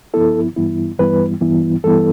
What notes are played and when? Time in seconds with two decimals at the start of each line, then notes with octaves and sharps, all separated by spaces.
0.14 G2 F3 B3 E4 A4
0.56 G2 E3 G3 B3 E4
0.99 G2 E3 G3 B3 E4 B4
1.41 G2 E3 G3 B3 E4
1.83 G2 E3 G3 B3 E4 A4